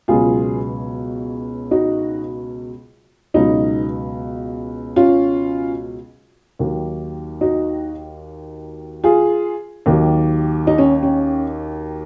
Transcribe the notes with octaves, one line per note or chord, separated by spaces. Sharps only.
C#2 B2 F#3 F4 G#4
D#4 F#4
C#2 B2 F#3 D#4
C#4 F4
D#2 D#3 F#3
D#4 F#4
F4 G#4
D#2 D#3 F#3
D#4
C#4
C#4